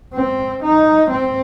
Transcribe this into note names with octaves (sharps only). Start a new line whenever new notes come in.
C4
D#4
C4